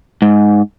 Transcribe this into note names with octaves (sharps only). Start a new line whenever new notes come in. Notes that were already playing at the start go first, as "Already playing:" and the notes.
G#2